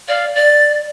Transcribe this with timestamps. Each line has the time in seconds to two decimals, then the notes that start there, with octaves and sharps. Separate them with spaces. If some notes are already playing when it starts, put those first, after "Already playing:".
0.08 D5 F5
0.36 D5 A6